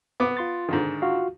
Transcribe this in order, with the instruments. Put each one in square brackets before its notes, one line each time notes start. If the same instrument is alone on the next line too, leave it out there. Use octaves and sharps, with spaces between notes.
[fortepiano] B3 D6
[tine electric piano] F4 C6 A6
[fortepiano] G#2 D3 D#3
[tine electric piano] F4 F#4 F5